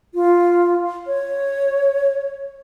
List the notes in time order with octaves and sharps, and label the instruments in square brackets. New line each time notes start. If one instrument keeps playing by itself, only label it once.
[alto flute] F4
C#5